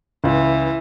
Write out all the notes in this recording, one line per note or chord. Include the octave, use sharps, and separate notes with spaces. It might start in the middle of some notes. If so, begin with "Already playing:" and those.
C#2 E3